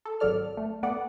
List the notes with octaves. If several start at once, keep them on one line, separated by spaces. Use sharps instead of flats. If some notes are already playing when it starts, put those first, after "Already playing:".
A4
G#1 F#3 A4 D5 F6
A3
A3 B3 D5 F#5